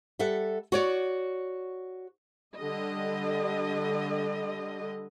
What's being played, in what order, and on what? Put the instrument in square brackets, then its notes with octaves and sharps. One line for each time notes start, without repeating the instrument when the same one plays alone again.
[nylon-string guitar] G3 A4 E5 F#5
F#4 C#5 D5
[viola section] D3 G3 D#5